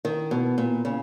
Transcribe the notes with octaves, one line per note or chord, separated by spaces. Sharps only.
D#3
B2
A#2
C#3